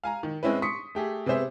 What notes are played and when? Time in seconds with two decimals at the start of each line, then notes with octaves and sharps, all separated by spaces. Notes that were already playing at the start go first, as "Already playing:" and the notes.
0.04 F5 G#5 A#5
0.23 D#3
0.43 G#3 C4 C#4 E4 B4
0.62 C6 C#6 D#6 B6 C#7
0.95 A3 G4 G#4
1.26 C3 B3 G#4 C5 E5